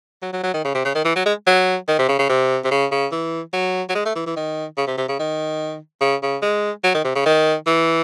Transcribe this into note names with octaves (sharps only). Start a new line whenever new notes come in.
F#3
F#3
F#3
D#3
C#3
C3
C#3
D#3
E3
F#3
G#3
F#3
D#3
C3
C#3
C#3
C3
C3
C#3
C#3
E3
F#3
F#3
G#3
A3
E3
E3
D#3
C#3
C3
C3
C#3
D#3
C#3
C#3
G#3
F#3
D#3
C3
C#3
D#3
E3